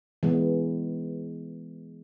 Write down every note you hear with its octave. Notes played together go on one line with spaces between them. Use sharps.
E3 G#3 B3